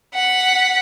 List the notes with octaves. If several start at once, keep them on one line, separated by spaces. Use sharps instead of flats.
F#5 B6